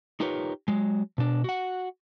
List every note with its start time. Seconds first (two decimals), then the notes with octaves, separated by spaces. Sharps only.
0.20 D#4 F4 G4 A#4 B4 C#5
0.68 F#3 G#3
1.18 B2 D4
1.44 F#4 F#5